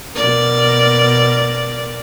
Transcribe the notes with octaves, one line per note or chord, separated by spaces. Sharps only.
B2 A#4 D5